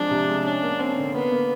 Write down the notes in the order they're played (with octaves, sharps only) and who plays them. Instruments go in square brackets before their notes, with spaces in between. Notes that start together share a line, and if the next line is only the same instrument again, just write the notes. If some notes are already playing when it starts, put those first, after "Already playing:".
Already playing: [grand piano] F3 G#3 C4 [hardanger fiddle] D4
[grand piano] C3
G#3
[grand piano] C#4 [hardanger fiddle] D4
[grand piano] A#3
[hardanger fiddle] C4 [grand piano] C#4
[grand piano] D3
[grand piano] A#3 [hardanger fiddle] B3
[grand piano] A#3